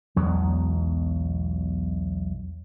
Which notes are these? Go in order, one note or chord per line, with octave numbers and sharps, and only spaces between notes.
B1 E2 F#3 G#3